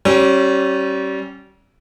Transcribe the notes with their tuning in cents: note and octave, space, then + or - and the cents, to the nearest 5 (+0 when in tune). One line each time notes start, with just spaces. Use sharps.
G3 -35 C#4 -20